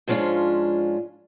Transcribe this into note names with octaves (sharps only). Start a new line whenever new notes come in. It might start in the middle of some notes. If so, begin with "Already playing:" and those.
G#2 F3 G#3 C#4 D4 F4